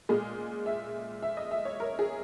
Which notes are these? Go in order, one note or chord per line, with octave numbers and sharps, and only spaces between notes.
A#2 G#3 G#4
E5
E5
D#5
E5
C#5
A#4
G#4